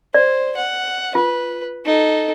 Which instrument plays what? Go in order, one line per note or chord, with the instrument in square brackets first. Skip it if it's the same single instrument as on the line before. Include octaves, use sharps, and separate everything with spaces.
[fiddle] C5 [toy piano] D5
[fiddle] F#5
[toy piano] F4 [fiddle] B4
[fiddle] D#4 A4